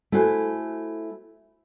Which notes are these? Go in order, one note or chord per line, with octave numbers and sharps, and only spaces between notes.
A3 E4 F#4 C5 G#5